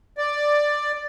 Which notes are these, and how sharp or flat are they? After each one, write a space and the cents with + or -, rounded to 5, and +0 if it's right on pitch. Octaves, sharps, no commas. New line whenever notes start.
D5 +5